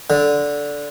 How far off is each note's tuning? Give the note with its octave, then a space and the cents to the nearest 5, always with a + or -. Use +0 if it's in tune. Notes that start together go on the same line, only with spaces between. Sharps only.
D3 -10